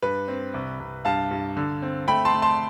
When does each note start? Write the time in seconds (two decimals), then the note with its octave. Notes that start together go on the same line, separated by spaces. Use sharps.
0.02 G2 B4
0.28 C4
0.54 C2
0.80 C2
1.05 G2 F5 A5
1.31 G2
1.57 D3
1.82 C4
2.08 A3 G5 B5
2.25 A5 C6
2.34 A3
2.42 A5 C6